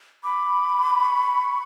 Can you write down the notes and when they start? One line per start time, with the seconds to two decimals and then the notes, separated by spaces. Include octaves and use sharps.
0.24 B5 D6
1.02 C#6